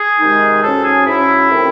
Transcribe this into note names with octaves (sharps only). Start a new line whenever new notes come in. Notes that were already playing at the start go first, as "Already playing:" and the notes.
Already playing: G#4
C3 D#3 G#3 D#4
G#2 F#3 C#4 A4
G#4
G#2 F#3 C#4 E4
C3 D#3 A3 C4